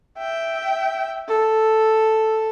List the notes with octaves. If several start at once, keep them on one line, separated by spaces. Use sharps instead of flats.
E5 G5
A4